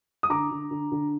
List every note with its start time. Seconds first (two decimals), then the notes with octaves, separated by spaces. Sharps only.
0.23 D#6
0.30 D3 A#5 D6
0.51 D3
0.71 D3
0.92 D3